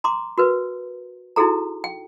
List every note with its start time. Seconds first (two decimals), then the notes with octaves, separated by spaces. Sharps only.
0.04 A#5 C6 D6
0.38 F#4 A#4 B4
1.36 D#4 E4 F#4 G#4 A4 A#5
1.84 G5